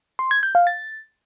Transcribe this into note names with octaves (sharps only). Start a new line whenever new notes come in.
C6
G#6
G6
F5
A6